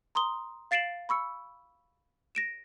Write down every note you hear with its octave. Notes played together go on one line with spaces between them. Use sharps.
A#5 C6 D#6 G7
F5 A6 C7 D7 E7 F#7
B5 C#6 E6 C#7
A#6 D7 E7